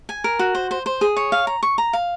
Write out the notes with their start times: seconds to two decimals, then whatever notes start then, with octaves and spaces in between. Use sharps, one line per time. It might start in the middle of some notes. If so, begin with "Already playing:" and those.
0.09 G#5
0.24 A#4
0.39 F#4
0.55 C5
0.71 C5
0.86 C5
1.01 G#4
1.17 C#5
1.32 F5
1.47 A#5
1.63 C#6
1.78 A#5
1.93 F5